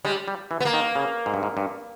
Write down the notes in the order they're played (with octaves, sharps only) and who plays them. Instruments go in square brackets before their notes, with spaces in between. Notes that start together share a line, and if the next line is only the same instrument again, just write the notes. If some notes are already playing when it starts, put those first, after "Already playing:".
[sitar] G3 [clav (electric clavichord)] G#3
[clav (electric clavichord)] G3
E3
[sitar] B3
A#3
[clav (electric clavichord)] D#3
C#3
G#2
G2
G#2
G2